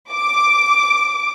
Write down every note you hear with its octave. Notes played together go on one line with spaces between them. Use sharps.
D6